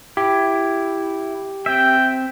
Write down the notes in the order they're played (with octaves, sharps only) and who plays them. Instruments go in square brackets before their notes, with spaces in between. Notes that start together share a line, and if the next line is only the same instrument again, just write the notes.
[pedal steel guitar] E4 [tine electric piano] G4
[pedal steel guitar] C4 E5 [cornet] G5